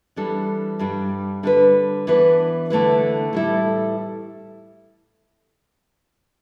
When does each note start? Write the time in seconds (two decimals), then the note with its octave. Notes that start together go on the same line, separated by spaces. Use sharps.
0.16 E3 G3 D4 A4
0.79 G2 G3 D4
1.43 D3 G3 D4 B4
2.07 E3 B3 D4 B4
2.70 D3 A3 E4 B4
3.33 A2 G3 E4 A4